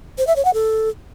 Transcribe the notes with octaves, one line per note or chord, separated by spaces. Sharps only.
C5
E5
C#5
F#5
A4